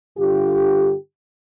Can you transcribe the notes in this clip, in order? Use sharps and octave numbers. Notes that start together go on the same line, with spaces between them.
G2 D3 F4 G4